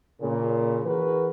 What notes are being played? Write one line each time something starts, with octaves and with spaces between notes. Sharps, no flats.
A#2 C#3
E3 F#4 G#4 A#4 B4